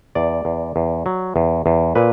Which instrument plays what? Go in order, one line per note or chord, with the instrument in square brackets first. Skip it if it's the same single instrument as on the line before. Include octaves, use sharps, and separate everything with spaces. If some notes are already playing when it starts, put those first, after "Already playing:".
[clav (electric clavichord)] E2 D5
E2
E2
F#3
E2
E2
A#2 B4